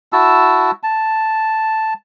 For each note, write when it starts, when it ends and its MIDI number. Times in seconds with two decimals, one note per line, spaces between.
0.13 0.71 64
0.13 0.71 66
0.13 0.71 81
0.13 0.71 88
0.83 1.94 81